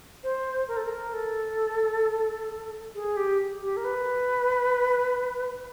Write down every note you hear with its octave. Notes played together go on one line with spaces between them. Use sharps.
C5
A#4
A4
A#4
A4
G#4
G4
G4
A#4
B4